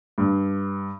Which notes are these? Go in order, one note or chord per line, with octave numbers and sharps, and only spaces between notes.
G2